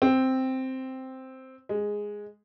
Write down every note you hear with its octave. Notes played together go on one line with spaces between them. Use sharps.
C4
G#3